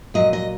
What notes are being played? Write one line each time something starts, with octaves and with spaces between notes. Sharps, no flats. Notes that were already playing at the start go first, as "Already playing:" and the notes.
A#2 F#3 D#5
D#5